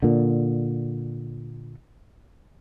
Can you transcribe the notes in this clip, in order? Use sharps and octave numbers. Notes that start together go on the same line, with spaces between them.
A#2 D3